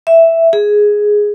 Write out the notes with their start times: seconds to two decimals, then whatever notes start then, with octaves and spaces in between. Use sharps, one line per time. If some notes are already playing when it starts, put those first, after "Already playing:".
0.07 E5
0.53 G#4